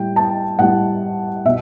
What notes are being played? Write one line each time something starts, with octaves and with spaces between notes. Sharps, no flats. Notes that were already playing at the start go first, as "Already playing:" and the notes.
Already playing: A2 G3 G5
A5
A2 G3 F#5
B2 E5